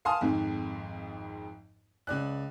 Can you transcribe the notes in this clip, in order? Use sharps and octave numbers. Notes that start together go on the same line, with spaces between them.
F5 G#5 A5 C6 D#6 F6
G#1 F2 G#2
C#2 D5 F#6